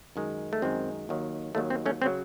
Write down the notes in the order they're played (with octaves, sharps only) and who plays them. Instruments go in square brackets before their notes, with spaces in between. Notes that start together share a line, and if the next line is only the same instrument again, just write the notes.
[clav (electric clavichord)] F#2 D#3 G#3
A3
F#2 D#3 G#3 C4
D#2 D#3 F#3
D#2 D#3 F#3 A3
C4
A3 C#4
C#3 F#3 C4